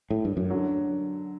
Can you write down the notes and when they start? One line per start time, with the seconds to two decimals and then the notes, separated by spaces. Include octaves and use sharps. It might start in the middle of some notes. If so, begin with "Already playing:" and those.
0.10 A2
0.25 G2
0.37 F#2
0.50 D3 F#3